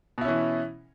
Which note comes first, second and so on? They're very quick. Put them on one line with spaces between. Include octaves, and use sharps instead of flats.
B2 E4 C#4 E3